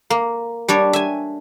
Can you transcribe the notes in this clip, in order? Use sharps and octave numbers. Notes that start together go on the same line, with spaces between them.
A#3
G3 D4 C#5 D5
E5 G#5